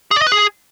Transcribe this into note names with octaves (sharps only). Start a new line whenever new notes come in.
G#4
D5
D#5
B4
G#4